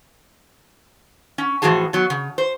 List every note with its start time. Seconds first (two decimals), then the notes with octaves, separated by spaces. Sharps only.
1.38 C#4
1.62 A2 E3 F3 F#4 G#4 A5
1.93 F#3 B3
2.10 C#3
2.38 C5